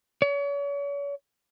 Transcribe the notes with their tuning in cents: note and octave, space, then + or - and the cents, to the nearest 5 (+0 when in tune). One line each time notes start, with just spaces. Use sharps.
C#5 +40